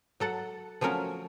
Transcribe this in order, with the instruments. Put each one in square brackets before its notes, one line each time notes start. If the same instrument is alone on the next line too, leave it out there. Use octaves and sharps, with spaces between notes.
[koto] F#3 A4 F#5
F3 F#3 A3 C#4 A#4